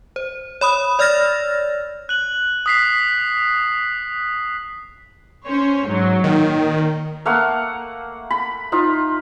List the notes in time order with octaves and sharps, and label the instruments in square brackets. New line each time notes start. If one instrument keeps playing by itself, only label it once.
[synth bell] C5
C#5 B5 D#6
C#5 D5 E6 F6 A6 A#6
[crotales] F#6 F#7
D#6 B6 C7
[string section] C#4 C5 C#5
G#2 F#3
[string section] A#2 [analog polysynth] D#3
[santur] A3 A#3 F5 F#5
B5
D#4 F4